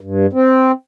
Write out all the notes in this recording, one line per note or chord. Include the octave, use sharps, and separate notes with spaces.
G2
C4